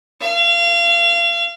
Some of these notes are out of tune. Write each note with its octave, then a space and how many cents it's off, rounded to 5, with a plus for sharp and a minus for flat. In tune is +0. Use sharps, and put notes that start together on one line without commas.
F5 -30